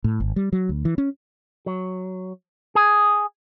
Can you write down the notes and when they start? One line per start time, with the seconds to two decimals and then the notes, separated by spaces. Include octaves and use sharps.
0.04 A2
0.20 G#1
0.36 G3
0.53 F#3
0.69 D2
0.85 E3
0.98 C#4
1.66 F#3
2.75 G#4